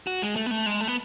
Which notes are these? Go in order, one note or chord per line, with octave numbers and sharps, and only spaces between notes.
F#4
G#3
A3
B3
A3
G#3
A3
B3